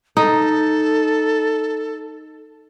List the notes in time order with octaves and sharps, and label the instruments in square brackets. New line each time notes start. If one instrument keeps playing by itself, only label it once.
[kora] D#4 [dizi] A4